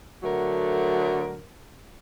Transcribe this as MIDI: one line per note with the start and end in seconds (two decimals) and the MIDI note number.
0.23 1.44 50
0.23 1.44 54
0.23 1.44 57
0.23 1.44 70